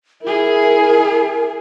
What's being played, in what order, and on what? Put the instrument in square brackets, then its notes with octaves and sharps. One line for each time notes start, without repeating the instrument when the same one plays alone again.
[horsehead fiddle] E4 G#4 [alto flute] A#4